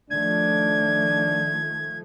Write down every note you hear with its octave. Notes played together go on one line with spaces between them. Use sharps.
D#3 F3 A3 D4 G#6